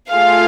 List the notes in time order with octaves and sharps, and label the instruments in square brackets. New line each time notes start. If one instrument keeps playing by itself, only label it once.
[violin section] A3 F4 G#4 F5